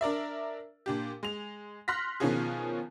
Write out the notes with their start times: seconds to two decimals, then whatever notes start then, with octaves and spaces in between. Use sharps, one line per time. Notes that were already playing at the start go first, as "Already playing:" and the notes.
0.01 D4 A#4 D5 E5
0.86 A#2 D4 G4
1.23 G#3 F7
1.88 C6 F6 F#6 A#6 B6
2.20 B2 D#3 F3 C#4 F4 G#4